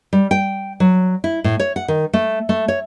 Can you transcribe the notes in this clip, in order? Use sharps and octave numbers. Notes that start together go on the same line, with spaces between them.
G3
G5
F#3
E4
A2
C#5
F#5
D#3
A3
A3
C#5